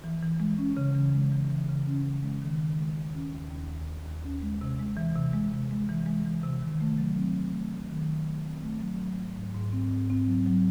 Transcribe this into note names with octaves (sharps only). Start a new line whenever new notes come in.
E3
E3
G#3
C#4
C#3
E3
G#3
E3
E3
C#3
C#4
E3
G#3
D#3
D#3
G#3
D#2
C#4
D#2
D#2
D#2
D#2
D#2
C#4
G#3
C3
G#3
E3
C3
G#3
C3
G#3
E3
G#3
E3
C3
D#3
A3
F#3
C4
C4
A3
F#3
D#3
F#3
A3
C4
A3
F#3
G#2
F#3
G#2
G#2
C4
G#2
C4
F#3
F#3